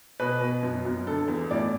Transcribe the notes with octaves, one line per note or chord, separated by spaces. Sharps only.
B2 B4
B2
F#2
F#2
D3 A4
E2
A2 D5